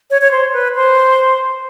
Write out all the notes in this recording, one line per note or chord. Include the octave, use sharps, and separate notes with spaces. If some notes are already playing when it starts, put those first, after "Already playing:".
C#5
C#5
C5
B4
C5